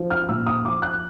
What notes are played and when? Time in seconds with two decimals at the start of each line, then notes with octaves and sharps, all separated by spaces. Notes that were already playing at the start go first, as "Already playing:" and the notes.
Already playing: F3
0.10 F6
0.29 A#2 E6
0.46 D#6
0.65 F3 D6
0.82 F#6